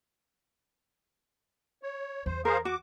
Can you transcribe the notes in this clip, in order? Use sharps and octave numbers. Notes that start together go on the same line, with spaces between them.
C#5
E2 C5
G#4 A#4 C5 F5
F#4 D6